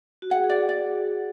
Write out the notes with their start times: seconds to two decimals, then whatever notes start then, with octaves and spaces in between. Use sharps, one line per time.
0.22 F#4
0.30 G#4 F#5
0.44 G#4
0.49 D5
0.56 G#4
0.69 D5